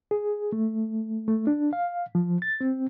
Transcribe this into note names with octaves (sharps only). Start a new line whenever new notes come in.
G#4
A3
A3
D4
F5
F3
A6
C4